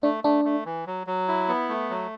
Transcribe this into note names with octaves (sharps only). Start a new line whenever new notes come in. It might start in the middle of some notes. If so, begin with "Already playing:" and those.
A3 D4
A3 D4
A3
E3
F#3
F#3
E4
B3
A3
F#3